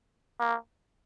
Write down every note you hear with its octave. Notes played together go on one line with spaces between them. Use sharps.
A#3